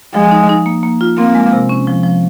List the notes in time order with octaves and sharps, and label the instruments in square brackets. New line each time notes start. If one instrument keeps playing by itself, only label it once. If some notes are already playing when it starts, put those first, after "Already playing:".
[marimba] F3 [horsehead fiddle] G#3
[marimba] D#4
D#4
A#3
A#3
F4
[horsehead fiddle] A#3 [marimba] C4
[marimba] G#3
C3
C#4
F3
F3